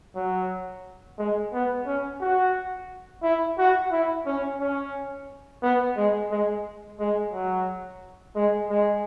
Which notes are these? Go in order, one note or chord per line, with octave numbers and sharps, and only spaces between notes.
F#3
G#3
B3
C#4
F#4
E4
F#4
E4
C#4
C#4
B3
G#3
G#3
G#3
F#3
G#3
G#3